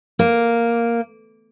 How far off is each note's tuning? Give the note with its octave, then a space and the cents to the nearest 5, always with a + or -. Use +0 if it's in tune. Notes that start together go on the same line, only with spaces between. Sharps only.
A#3 +0